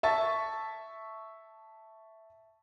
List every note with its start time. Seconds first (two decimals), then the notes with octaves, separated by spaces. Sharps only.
0.03 E5 A5 C#6 A6